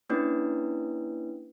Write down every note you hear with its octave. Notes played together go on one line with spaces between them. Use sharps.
A#3 C#4 D4 E4 B4